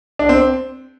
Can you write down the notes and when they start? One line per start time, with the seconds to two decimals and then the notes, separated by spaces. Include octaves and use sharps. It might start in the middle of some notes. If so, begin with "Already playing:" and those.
0.19 D4
0.29 C4